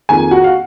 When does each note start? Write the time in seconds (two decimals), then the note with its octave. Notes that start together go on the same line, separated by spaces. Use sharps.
0.09 F2 D#3 A#3 F4 G#4 G#5
0.31 F#4 F#5
0.44 F5